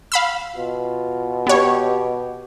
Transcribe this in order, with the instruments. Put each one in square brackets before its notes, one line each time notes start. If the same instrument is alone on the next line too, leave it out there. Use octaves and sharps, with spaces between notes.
[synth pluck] F5 B5 E6
[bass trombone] B2 [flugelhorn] F4
[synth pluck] B3 C#5 [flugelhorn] G4